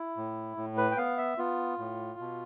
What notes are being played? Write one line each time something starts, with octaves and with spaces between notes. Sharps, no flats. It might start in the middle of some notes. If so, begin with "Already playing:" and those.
Already playing: E4
A2
A2
B4
G5
B3 F5
E5
B3 F4
A2
B2